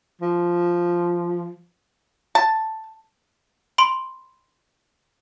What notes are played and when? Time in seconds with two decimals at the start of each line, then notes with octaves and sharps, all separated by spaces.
0.21 F3
2.35 A5
3.78 B5 C6 D7